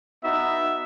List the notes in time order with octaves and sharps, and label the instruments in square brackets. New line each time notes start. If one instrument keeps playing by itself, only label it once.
[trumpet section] B3 D#4 F#4 E5